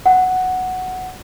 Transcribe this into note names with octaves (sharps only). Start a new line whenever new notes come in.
F#5